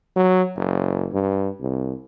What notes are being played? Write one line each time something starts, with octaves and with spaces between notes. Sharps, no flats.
F#3
F#1
G2
C2